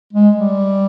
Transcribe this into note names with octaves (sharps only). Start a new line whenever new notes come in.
G#3
G3